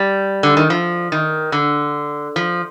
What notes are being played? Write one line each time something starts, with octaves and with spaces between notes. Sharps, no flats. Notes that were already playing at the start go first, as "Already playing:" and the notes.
Already playing: G3
D3
D#3
F3
D#3
D3
F3